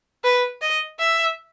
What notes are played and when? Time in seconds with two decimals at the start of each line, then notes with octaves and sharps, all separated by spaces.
0.24 B4
0.61 D#5
0.99 E5